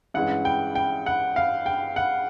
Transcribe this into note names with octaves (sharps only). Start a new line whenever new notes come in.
G2 E3 G#3 C#4 F#5
G5
G5
F#5
F5
G5
F#5